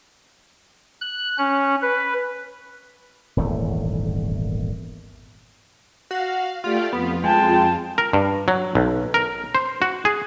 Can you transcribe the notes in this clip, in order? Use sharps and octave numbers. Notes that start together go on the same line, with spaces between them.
F#6
C#4
B4
D#1 G#1 E2 A3
F#4 F5
A3 F4 G4 D5
F2 B3 F4
G#3 G5 A5
A#4
G2
F#3
B1
A#4
C5
F#4
G#4